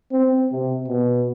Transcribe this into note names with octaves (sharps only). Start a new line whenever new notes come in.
C4
C3
B2